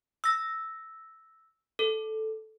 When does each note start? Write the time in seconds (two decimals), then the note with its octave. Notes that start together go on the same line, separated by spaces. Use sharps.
0.24 E6 A#6
1.79 A4